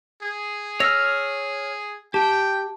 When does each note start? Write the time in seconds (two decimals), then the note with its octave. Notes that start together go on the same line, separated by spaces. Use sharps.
0.23 G#4
0.80 C#5 E6 F6 A#6
2.14 G4 G5 A5